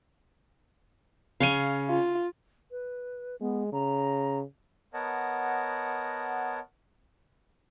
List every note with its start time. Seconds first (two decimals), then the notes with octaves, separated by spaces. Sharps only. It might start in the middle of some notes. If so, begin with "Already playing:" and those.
1.40 C#3 C#4 F5 C6 C#6 D#7
1.89 F4
2.71 B4
3.41 G#3 B3
3.73 C#3 A#5
4.94 B3 A#4 C#5 D#5 F#5 A5